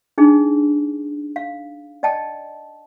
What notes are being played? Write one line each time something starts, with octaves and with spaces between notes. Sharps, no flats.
D4 D#4 G#4
F5
D5 D#5 G5 A5